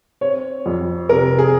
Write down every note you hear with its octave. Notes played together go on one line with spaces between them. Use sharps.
C4 C#5
F2
C3 A#4
G#4